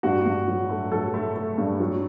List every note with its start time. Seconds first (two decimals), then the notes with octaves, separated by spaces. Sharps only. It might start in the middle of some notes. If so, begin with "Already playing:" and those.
0.03 G2 F#4
0.26 G2
0.47 F#3
0.69 A3
0.92 F#3 A4
1.14 A3
1.36 A3
1.58 G2
1.80 F#3